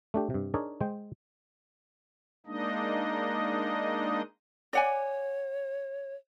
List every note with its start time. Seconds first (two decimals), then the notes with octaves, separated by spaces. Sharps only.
0.14 A3 D4 G4
0.30 G2 C3
0.54 D4 D#4 G#4 A#4 C#5 D5
0.81 G#3 C5 G5
2.46 G#3 A#3 D4 D#4 D#5
4.73 C#5 D5 F#5 G#5